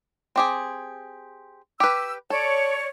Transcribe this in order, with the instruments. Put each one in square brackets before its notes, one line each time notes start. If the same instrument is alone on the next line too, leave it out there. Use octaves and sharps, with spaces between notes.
[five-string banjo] C4 G4 G#4
[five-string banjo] G4 B4 [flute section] E6
[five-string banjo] A4 [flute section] C#5 D5